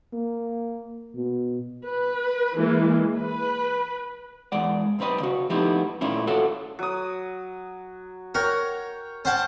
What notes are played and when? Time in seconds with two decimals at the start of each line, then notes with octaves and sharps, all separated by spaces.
0.13 A#3
1.16 B2
1.85 B4
2.58 E3 G#3 A#3
3.16 B4
4.52 E2 G#3 D5 F#5
4.99 B1 C3 C4 B4 D#5
5.20 C#3 F#4
5.50 F3 A3 B3 D#4 E4 G4
6.01 A#2 A3 C#4 E4 F4
6.27 F4 F#4 A4 C#5 E5 F#5
6.79 F#3 D#6
8.35 A#4 C#5 F#5 G5
9.25 C#4 C5 F#5 G5 A5